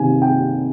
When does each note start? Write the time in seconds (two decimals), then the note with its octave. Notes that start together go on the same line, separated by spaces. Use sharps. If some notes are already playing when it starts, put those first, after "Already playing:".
Already playing: C3 D#3 B3 G#5
0.22 G5